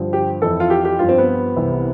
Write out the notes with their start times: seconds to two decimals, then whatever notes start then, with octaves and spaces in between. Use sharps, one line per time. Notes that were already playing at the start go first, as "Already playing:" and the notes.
Already playing: G2 D3 F3
0.13 G4
0.42 F2 E3 A4
0.60 F4
0.70 G4
0.85 G4
0.99 G2 F3 F4
1.09 C4
1.18 B3
1.56 C2 C3 E3